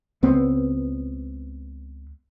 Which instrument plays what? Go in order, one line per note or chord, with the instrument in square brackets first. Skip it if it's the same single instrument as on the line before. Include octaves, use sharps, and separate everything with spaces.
[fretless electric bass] C#2 B3 C4